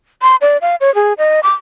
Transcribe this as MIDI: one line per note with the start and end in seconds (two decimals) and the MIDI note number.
0.22 0.36 84
0.41 0.57 74
0.62 0.76 77
0.81 0.94 73
0.95 1.13 68
1.18 1.40 75
1.43 1.53 86